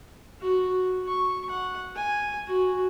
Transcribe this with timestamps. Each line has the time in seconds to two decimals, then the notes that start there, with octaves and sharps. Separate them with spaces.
0.41 F#4
1.08 C#6
1.50 F#5
1.96 G#5
2.47 F#4